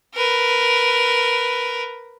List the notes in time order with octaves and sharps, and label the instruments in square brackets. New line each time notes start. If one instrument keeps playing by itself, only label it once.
[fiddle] A#4 B4